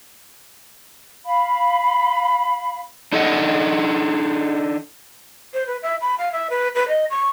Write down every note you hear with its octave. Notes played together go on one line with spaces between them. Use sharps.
F5 B5
D4 D#4 A4 D#5 F5 F#5
C5
B4
E5
B5
F5
E5
B4
B4
D#5
C#6